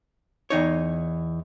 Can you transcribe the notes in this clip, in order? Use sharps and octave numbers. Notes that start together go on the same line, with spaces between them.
E2 D#4 C#5